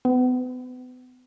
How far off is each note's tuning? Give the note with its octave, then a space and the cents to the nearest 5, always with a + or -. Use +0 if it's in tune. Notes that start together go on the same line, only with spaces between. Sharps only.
B3 +35